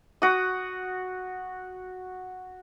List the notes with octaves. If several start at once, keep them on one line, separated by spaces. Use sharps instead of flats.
F#4 D#6